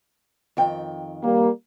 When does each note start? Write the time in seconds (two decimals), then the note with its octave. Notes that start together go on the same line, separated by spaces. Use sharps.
0.57 F2 D#3 G5
1.23 G3 A#3